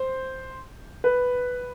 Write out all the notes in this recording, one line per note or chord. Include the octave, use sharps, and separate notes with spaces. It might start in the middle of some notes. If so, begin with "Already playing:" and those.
Already playing: C5
B4